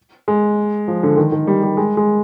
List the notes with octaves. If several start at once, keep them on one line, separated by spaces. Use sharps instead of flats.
G#3
F3
D3
D#3
D#3
G3
G3
G#3
G#3